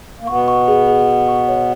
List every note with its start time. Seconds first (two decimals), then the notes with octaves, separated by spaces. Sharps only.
0.20 A#3
0.27 B2 B3 C#6
0.48 C#6
0.68 G#4
0.88 G#4
1.09 G#4
1.28 C#6
1.48 C#5